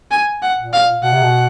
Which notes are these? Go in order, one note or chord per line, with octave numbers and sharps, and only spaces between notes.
G#5
F#5
A#2
F5
B2 F#5
C3
B2